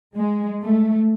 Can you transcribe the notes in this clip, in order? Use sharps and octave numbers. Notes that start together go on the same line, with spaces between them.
G#3
A3